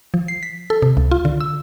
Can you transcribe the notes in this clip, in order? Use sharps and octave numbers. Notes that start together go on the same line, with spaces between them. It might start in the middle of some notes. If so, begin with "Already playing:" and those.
F3
C7
B6
A4
C3
C#2
F4
D3
E6